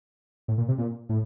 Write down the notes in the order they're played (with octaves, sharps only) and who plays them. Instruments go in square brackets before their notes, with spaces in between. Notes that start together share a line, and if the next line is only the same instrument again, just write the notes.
[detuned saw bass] A2
A#2
C3
A#2
A2